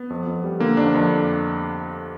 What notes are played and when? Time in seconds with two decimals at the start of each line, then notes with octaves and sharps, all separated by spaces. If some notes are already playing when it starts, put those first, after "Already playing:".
Already playing: B3
0.10 F2
0.27 F2
0.44 G3
0.60 D3 A#3
0.77 F2 D4
0.94 F2